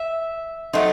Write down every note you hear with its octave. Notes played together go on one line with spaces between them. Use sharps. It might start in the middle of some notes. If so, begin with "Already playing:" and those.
Already playing: E5
F#3 A3 C4 D#4